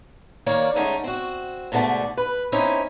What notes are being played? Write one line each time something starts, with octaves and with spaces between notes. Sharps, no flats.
D#3 A#3 C#5 D5 F5
D3 G#3 A3 C#4 D#4
C4 F#4
G#2 B2 D3 A3 D5
B4
C4 C#4 D#4 E4